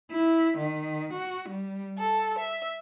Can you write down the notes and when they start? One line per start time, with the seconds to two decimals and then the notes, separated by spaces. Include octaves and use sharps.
0.11 E4
0.58 D#3
1.12 F#4
1.48 G3
1.97 A4
2.38 E5